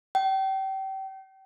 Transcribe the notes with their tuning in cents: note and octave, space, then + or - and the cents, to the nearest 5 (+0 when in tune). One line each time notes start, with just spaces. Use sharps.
G5 -30